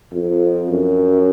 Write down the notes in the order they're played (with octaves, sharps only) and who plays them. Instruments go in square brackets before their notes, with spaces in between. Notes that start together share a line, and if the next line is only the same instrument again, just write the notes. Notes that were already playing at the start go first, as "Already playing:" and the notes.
[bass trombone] F2
F#2